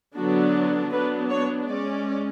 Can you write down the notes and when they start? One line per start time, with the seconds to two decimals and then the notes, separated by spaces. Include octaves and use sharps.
0.15 D3 F#3 B3 D4 F#4
0.91 F#3 B3 D4 B4
1.29 C#5
1.67 G#3 C#4 D5